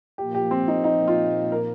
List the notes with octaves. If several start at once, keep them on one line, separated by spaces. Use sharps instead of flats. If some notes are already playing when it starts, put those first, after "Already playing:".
A#2 F3 A#3 G4
G4
C4
D#4
D#4
F4
A#4